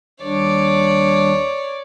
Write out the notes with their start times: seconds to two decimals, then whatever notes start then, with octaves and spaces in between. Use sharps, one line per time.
0.22 D#2 G3 D4 C#5 D5